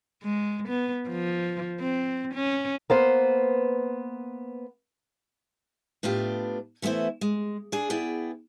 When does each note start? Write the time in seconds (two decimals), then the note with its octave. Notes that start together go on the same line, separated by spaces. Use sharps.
0.22 G#3
0.68 B3
1.09 F3
1.80 C4
2.34 C#4
2.90 A#3 B3 C5
6.03 A2 B3 D4 F4 G4
6.82 E3 A3 B3 E4 C5
7.21 G#3
7.72 D4 G#4
7.90 B3 E4 G#4 D5 G5